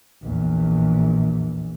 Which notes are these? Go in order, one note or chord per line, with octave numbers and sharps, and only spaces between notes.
A#1 E2